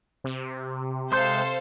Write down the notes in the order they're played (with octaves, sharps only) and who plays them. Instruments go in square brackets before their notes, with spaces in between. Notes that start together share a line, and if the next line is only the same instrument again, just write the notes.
[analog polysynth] C3
[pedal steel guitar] G#3 C6 G6 [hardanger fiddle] A4 F5 [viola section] C5